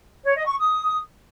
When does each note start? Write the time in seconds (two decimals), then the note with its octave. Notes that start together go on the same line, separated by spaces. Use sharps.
0.24 C#5
0.35 D#5
0.46 C#6
0.57 D#6